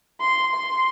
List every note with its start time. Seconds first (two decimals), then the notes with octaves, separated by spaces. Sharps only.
0.21 C6
0.55 C6